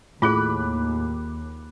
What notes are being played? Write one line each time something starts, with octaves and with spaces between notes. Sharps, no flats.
D#2 A2 F4 G#4 B5 D6 F#6